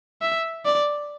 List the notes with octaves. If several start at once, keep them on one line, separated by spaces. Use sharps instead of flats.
E5
D5